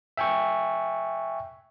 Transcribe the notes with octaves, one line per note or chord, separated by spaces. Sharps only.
E5 G5 G#5 C#6